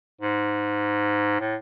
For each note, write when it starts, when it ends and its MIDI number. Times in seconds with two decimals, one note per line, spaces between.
0.21 1.39 44
1.40 1.56 45